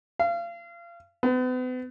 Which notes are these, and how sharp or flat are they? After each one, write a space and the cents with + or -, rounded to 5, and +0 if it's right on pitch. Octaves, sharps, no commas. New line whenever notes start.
F5 -30
B3 +40